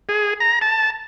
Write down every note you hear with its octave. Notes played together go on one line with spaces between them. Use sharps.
G#4
A#5
A5